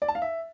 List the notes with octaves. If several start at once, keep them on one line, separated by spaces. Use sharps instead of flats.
D5
A5
F5
E5